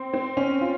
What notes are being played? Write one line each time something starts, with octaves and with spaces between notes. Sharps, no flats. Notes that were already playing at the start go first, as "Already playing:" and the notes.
Already playing: C4
C4
C#4
F4